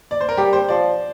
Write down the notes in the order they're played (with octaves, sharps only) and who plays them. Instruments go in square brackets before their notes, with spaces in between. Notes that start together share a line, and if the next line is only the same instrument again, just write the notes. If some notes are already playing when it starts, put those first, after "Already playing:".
[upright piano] D5
C5
A#4
[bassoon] G3 [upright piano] G4
[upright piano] C5
[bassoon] F3 [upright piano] D5